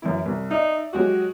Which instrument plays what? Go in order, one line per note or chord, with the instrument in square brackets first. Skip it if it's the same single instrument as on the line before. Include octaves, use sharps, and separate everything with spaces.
[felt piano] F#2 E3 E4
C2
[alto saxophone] D#4 [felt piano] D5 E5
[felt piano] F#3 G#3 G4 [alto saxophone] F#4